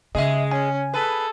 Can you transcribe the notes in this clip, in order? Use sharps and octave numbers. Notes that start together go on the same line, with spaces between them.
C#3 G#3 G#4 D#5 E5
C#4 G#5
G#4 A4 B4